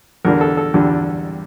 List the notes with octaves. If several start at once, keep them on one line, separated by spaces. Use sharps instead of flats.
E2 D3 G3 D4 A#4
A4
A4
E2 D3 G3 D4